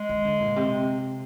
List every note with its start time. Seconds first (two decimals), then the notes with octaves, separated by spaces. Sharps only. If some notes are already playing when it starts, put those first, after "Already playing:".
Already playing: G#3
0.09 D#3
0.25 D3
0.40 A#2
0.56 C3